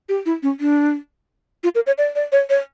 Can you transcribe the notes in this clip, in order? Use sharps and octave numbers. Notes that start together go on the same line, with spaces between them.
G4
E4
C#4
D4
F4
A#4
C#5
D5
D5
C#5
C#5